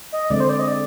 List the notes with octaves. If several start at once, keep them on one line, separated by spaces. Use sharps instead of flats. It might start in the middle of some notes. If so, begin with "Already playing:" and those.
D#5
D3 G#3 C4 D5
C5
D5
D#5
D5